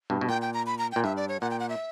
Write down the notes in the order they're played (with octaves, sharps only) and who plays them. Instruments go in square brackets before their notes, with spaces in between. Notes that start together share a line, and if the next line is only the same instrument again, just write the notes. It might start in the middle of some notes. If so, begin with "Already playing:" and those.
[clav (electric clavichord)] G2 B2
B2
[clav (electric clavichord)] A#2 [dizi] G5
[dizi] G5
A#5
B5
A#5
G5
[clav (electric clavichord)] A#2
[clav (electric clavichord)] G2 [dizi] E5
[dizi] D5
C#5
[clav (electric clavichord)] A#2 [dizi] F#5
[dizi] G5
F#5
E5